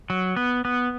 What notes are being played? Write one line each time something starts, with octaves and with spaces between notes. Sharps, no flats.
F#3
B3
B3